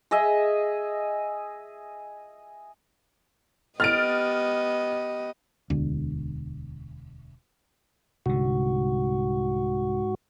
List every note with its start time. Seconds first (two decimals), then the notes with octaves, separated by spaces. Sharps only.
0.11 G#4 D#5 E5
3.80 B3 G4 D#5 F6 A6 D7
5.70 E1 D2
8.26 C2 G#2 D3 F#4